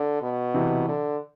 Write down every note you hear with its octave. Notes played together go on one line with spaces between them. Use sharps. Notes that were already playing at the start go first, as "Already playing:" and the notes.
Already playing: D3
B2
C3 E3
D3